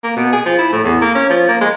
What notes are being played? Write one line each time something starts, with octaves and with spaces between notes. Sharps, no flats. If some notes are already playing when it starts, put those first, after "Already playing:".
A#3
B2
G#4
F3
E4
A2
E2
A#3
C#4
F3
A#3
G#3